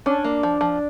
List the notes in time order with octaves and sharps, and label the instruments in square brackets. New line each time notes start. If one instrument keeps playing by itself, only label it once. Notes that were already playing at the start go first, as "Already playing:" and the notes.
[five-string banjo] C#4 [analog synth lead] D4
[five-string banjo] A#3
F3
F3